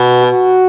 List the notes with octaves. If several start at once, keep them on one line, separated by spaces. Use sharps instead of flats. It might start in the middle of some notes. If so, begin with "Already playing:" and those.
Already playing: B2
F#4